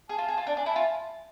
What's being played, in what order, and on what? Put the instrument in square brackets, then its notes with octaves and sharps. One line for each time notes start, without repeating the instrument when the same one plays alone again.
[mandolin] G#4 [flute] A5
[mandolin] F4
G#4
F4
[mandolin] D4 [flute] D5
[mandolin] D4 [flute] G#5
[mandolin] E4 [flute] A5
[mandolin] F4 [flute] G#5